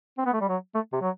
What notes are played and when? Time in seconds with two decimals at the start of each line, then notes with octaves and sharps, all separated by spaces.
0.18 C4
0.26 B3
0.34 A3
0.41 G3
0.49 F#3
0.74 A3
0.93 C3
1.01 F#3